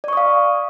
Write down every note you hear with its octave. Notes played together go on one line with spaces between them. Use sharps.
D5 F5 C#6 D#6